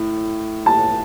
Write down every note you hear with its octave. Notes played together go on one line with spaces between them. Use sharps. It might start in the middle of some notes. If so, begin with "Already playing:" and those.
Already playing: A2
A5